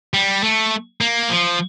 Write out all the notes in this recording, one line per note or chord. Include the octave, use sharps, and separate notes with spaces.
G3
A3
A#3
F3